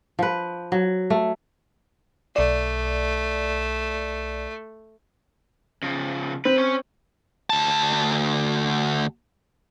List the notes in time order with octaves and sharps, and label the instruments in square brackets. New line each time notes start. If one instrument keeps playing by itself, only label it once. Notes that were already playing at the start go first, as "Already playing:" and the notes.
[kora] F3 B4
F#3
A3
[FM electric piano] B1 D5 [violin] A3
[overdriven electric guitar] C#3 F3
[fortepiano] C4 [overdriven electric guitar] B4
[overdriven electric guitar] C#4 C#5
[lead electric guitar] D2 A5